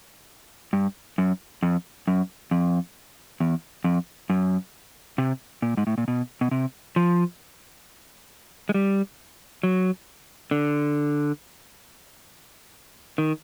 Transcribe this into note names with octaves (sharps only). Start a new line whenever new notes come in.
G2
F#2
F2
F#2
F2
E2
F2
F#2
C3
A#2
G#2
A2
A#2
B2
B2
C3
F3
G#3
G3
F#3
D3
D#3